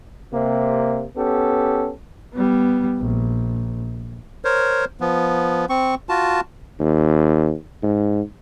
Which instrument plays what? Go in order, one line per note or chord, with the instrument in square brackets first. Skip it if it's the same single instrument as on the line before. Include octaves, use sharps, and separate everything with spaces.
[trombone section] C3 A#3
B3 C#4 G4 A4
[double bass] G3 B3
A#1
[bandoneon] A#4 C5 C#5
F3 B3
C4 C#6
F4 F#4 A5
[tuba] D#2
G#2